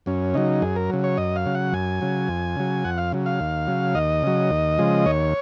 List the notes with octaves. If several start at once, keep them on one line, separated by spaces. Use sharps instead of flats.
F#2 C#4
C#3 F#3 D#4
F#2 G#4
A#4
C#3 F#3
C#5
F#2 D#5
F5
C#3 F#3
F#5
F#2 G#5
C#3 F#3
F2
C#3 F#3
F2 F#5
F5
C#3 F#3
F5
D#2
C#3 F#3
D#2 D#5
C#3 F#3
D#2
C#3 F3 G#3
D#2 C#5